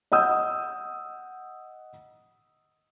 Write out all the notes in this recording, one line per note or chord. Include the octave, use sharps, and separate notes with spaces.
D#5 F#5 D#6 E6 G6